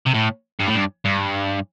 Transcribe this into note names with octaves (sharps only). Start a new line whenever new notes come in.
C3
A2
G2
A2
G2
G2